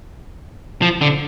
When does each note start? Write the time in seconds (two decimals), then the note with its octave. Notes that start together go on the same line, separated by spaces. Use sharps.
0.82 F3
1.01 D3